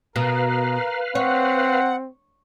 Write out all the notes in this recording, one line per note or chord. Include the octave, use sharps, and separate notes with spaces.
B2 A#4 B4 F5
C4 C#5 F#5